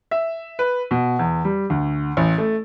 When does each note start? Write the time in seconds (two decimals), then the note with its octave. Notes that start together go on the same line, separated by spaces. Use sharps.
0.11 E5
0.59 B4
0.91 B2
1.19 E2
1.45 G3
1.70 D2
2.17 A1
2.38 A3